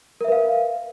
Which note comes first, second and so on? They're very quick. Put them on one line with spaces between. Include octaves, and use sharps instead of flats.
A#4 E5 B4 F5